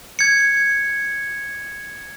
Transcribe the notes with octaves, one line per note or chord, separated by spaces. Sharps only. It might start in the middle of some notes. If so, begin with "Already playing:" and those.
G#6 C#7